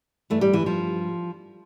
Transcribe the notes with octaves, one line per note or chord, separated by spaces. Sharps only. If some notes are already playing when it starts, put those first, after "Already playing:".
G2 E3 A3
G3
E3
F3